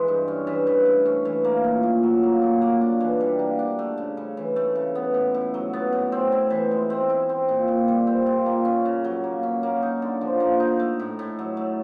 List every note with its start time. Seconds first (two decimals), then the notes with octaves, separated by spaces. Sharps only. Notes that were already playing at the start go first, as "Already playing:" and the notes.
Already playing: E3 G#3
0.08 G2
0.28 C#4
0.47 E3
0.67 E3
0.86 A3
1.06 C#4
1.25 E3
1.44 A#3
1.64 A#2
1.83 A#2
2.03 F#3
2.23 A#3
2.42 A#2
2.62 A#3
2.81 D4
3.00 E3
3.21 G3
3.39 A#3
3.59 D4
3.79 A3
3.98 C#3
4.17 C#3
4.37 E3
4.56 A3
4.75 C#3
4.95 B3
5.14 A2
5.34 A2
5.54 F#3
5.73 B3
5.93 A2
6.12 C4
6.32 E4
6.50 E3
6.71 G#3
6.90 C4
7.09 E4
7.29 C4
7.49 A#2
7.68 A#2
7.88 G3
8.07 C4
8.26 A#2
8.46 A#3
8.65 C#4
8.85 C#3
9.04 F#3
9.24 A#3
9.43 C#4
9.63 A#3
9.82 D#4
10.02 D3
10.21 F3
10.40 A#3
10.60 D#4
10.80 A3
11.00 A2
11.19 A2
11.39 F#3
11.57 A3